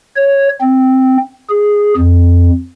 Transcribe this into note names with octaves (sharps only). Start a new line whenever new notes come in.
C#5
C4
G#4
F2